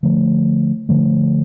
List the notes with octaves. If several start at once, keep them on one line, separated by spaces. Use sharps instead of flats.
D3 F3 A3
D3 F3 A3